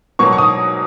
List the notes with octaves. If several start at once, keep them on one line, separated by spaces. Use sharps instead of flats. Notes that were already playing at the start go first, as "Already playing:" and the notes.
B2 F#3 A#3 C#6
C#6
D#6